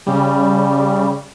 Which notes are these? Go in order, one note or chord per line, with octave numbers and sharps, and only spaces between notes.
C#3 G3